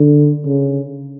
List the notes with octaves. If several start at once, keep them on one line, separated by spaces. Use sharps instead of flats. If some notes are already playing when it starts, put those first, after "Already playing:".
Already playing: D3
C#3